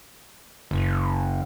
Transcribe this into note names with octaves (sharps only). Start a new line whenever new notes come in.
F#1